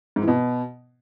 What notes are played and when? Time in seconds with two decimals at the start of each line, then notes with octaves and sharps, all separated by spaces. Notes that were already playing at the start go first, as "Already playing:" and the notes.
0.16 G#2
0.22 E3
0.28 B2